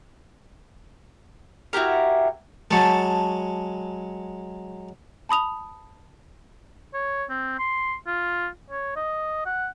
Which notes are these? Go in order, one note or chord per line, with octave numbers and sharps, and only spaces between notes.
E4 F#4 G4 A#4
F#3 G#3 A5 C#6
A5 B5 D#6 F7
C#5
C4
C6
F4
C#5
D#5
F#5